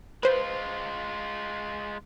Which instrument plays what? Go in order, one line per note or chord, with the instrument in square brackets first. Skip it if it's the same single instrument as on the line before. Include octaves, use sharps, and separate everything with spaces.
[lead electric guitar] G#3 F4 [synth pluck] B4 C5